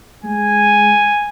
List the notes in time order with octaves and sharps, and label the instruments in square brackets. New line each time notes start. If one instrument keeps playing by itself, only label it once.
[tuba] G#3 [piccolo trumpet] G#5